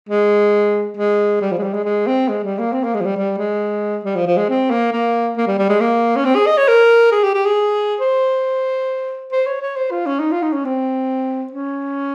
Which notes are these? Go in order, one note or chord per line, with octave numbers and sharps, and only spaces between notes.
G#3
G#3
G3
F3
G#3
G3
G#3
G#3
C4
G#3
G3
A#3
C4
A#3
G#3
F3
G3
G3
G#3
G3
F3
F3
G#3
C4
A#3
A#3
A#3
G3
G3
G#3
A#3
C#4
C4
G#4
D#5
C#5
A#4
G#4
G4
G4
G#4
C5
C5
C#5
C#5
C5
F4
C#4
D#4
F4
D#4
C#4
C4
C#4